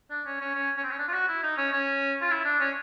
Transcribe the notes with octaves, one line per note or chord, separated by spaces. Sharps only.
D4
C#4
C#4
C#4
C#4
C4
C#4
D4
F4
F#4
E4
D#4
C#4
C#4
F4
E4
D4
C#4